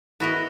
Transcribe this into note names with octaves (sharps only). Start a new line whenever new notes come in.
B3 E4 F#4 A#4 D#5